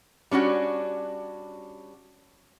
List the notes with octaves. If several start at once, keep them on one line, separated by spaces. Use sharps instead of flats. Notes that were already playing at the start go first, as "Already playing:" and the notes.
G3 C#4 D4 F#4